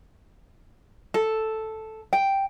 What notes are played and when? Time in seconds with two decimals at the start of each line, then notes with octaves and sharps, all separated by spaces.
1.14 A4
2.13 G5